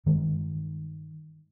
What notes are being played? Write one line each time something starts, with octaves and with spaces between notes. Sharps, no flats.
G2 D#3 G#3